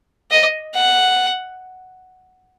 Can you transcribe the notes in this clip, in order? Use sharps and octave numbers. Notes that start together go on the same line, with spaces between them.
D#5
F#5